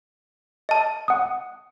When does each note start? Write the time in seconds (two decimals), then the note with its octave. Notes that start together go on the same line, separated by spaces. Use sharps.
0.69 D#5 A5
1.08 F#5 D#6